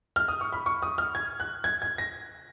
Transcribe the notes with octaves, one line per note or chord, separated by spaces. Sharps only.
F6
D#6
C#6
B5
C#6
D#6
F6
G#6
F#6
G#6
G#6
A#6